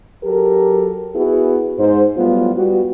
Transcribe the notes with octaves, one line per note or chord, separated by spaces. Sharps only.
F#3 G4 A4 A#4
B3 E4 F#4 G#4
G#2 C5
A2 F#3 G3 B3 F4
G3 B3 F#4